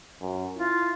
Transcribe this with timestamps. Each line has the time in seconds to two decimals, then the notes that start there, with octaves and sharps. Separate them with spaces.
0.21 F#2
0.57 E4 F4